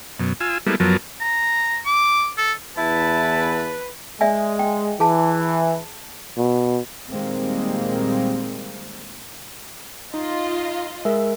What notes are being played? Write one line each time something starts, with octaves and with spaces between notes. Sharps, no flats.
F#2 B2
F4 G#5 E6
G3 G#3 A#3 B3 E4 A4
F#2 F3 F#3 B3 A#4 A5
A#5
D6
A4
E2 E4 B4 A5
G#3 D5 E5 G#5
G5
E3 G#4 A5
B2
A#2 D#3 G3 G#3 A#3 C4
D#4 F4 D#5
G#3 A#4 E5